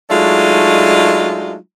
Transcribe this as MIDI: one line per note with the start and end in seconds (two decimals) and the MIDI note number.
0.10 1.54 54
0.10 1.54 56
0.10 1.54 57
0.10 1.54 62
0.10 1.54 63
0.10 1.54 65